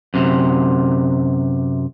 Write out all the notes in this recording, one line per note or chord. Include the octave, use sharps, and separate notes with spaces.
F#2 C3